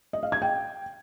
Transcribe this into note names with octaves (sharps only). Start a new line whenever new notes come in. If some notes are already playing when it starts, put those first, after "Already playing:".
D#5
F5
G#6
G5